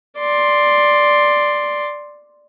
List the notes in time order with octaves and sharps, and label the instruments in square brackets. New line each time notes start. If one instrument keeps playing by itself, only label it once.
[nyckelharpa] D5 C6